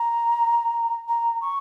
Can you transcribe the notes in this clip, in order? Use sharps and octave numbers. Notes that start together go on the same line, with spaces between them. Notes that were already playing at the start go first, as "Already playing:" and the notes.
Already playing: A#5
A#5
C#6